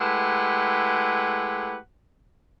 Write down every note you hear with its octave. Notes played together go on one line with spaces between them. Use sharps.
G#3 A3 E4 G4 B4 F#5